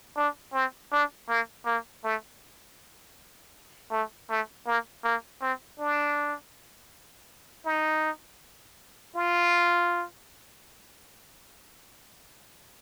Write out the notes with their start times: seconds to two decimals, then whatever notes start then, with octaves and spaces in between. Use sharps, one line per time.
0.16 D4
0.53 C4
0.91 D4
1.29 A#3
1.66 A#3
2.04 A3
3.91 A3
4.29 A3
4.67 A#3
5.04 A#3
5.41 C4
5.79 D4
7.65 D#4
9.16 F4